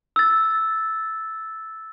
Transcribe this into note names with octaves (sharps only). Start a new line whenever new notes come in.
E6 A6